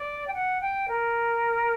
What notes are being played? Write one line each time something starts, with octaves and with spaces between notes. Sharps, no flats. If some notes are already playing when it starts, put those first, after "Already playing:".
Already playing: D5
G5
F#5
G5
A#4